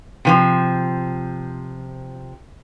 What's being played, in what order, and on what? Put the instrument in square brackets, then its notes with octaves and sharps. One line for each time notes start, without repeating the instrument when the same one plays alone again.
[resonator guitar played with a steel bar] C3 E3 F3